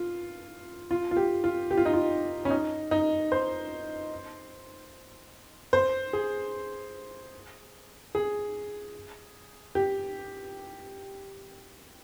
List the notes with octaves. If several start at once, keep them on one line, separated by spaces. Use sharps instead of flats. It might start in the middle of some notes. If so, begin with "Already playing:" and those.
Already playing: F4
F4
F4
G4
F4
G4
F4
D#4
F4
C#4
D#4
D#4
C5
C5
G#4
G#4
G4